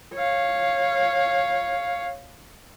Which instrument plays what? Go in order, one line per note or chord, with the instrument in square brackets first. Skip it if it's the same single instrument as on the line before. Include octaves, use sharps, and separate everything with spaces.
[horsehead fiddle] C#5 F5